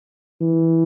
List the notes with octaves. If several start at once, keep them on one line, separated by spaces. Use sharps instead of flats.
E3